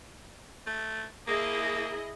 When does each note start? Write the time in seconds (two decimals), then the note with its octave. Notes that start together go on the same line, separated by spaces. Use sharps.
0.66 A3
1.27 A#3 E4 G#4 D#5